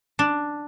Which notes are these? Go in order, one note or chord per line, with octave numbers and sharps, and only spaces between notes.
D4